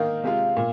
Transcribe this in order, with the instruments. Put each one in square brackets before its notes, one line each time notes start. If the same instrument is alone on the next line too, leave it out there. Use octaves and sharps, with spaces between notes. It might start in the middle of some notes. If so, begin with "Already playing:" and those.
Already playing: [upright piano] D#3 A#3 D#4 [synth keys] F5
[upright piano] C3 G#3 F4
A#2